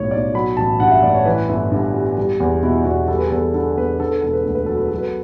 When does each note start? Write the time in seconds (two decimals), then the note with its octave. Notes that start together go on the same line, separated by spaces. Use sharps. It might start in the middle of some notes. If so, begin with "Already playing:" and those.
Already playing: B1 A2 G3 C#5
0.11 B1 D5
0.34 F#3 B5
0.57 A1 A5
0.80 G2 F#5
0.91 E5
1.03 A1 D5
1.15 C#5
1.25 E3 B4
1.49 G1 E4
1.72 G2
1.94 G3
2.18 G3
2.40 E2
2.63 B2 E4
2.85 E2 F#4
3.08 G3 A4
3.18 B4
3.28 E2 A4
3.54 D3 A4
3.77 E2 B4
4.00 D3 A4
4.11 B4
4.22 E1 A4
4.33 B4
4.44 D2 A4
4.55 B4
4.66 F#3 A4
4.77 B4
4.88 F#3 A4
4.98 B4